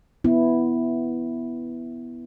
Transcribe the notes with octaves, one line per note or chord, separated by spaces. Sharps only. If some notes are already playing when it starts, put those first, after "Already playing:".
B3 E4